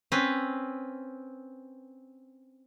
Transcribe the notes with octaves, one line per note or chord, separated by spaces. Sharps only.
C4 C#4 B4